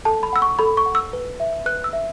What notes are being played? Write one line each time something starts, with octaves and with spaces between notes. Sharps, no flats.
A4 A5
B5
F#5 E6
C#6
A4 B5
C#6
F#5
E6
B4
E5
B4 F#6
E6
E5